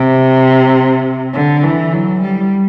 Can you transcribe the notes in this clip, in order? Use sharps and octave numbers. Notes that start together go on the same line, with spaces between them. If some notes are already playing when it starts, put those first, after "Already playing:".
Already playing: C3
D3
E3
F#3
G3